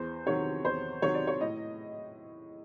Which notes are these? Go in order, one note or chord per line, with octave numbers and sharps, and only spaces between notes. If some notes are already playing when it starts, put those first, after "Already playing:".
Already playing: E2 C5
C3 D#3 F#3 C#5
E2 C5
C3 D#3 F#3 C#5
D5
C#5
A2 D#5